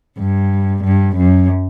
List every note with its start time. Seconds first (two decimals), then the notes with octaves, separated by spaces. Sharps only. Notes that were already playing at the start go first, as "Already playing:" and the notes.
0.17 G2
0.84 G2
1.16 F#2